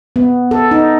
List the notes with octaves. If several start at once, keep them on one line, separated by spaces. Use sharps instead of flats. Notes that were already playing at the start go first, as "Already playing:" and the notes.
B3
A4
D#4